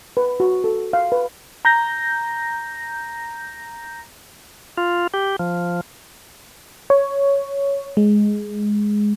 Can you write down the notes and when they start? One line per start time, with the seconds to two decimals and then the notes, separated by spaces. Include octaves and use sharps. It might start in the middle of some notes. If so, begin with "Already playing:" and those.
0.17 B4
0.40 F#4
0.64 A4
0.93 F5
1.12 B4
1.65 A#5 G6 A#6
4.77 F4
5.14 G4
5.39 F3
6.90 C#5
7.97 G#3